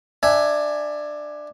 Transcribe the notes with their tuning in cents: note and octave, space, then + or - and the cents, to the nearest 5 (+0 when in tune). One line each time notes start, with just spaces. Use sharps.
D4 +15 E5 +0 G#5 +0